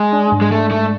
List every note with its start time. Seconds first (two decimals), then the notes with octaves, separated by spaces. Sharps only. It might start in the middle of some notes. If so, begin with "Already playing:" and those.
Already playing: G#3
0.13 D4
0.32 G#2
0.41 G#3
0.51 A3 D4
0.71 G#2 A3